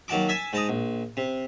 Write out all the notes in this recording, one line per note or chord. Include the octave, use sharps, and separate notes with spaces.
D#2 F#3 F#5 A5 D6
E5 G#5 A5
G#2 A5 A#5 D#6
A#1
C3